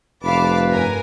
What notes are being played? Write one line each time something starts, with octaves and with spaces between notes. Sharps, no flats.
F1 B4 F5 A5 D6
G2 A#4 G#5